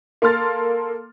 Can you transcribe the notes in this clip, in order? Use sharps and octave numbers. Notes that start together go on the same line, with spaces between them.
A#3 A4 C6 F6 A6